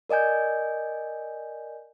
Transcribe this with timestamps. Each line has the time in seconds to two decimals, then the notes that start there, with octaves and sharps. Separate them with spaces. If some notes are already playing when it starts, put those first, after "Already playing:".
0.09 A#4 D5 D#5 G#5 G6